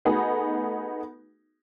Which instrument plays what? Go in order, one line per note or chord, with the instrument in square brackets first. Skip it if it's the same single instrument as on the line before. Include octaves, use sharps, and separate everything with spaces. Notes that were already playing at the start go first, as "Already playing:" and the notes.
[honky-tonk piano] A3 B3 D#4 F#4 G#4